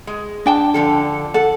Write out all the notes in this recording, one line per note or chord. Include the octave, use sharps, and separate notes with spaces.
G#3
D4 G5 A5
D3 F3 A4
A4 F#5